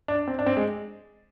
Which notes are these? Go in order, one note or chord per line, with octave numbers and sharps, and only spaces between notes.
D4
C4
D4
C4
G#3